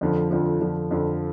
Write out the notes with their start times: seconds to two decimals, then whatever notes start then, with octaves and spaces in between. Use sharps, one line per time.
0.01 F2 D3 F3
0.31 F2 D3 F3
0.61 F2 D3 F3
0.91 F2 D3 F3